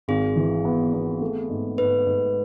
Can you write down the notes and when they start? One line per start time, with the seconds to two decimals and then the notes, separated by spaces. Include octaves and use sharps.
0.08 G#1 G#4
0.36 E3
0.65 B3
0.93 B3
1.21 A3
1.49 G#2
1.78 G#2 B4
2.07 G#2